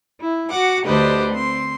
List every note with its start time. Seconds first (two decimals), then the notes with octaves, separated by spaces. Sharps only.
0.20 E4
0.48 F#4 F#5 D6
0.84 D2 D3 G4 B4 C5 D#5
1.32 C4 C6